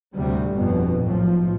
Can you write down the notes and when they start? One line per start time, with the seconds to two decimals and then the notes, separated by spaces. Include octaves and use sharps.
0.15 D2 A2 C3 G3
0.53 G1 F2 B2
1.04 B1 A2 F3